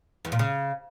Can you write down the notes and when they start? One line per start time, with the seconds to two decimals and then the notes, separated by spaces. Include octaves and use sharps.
0.25 E2
0.32 A#2
0.39 C#3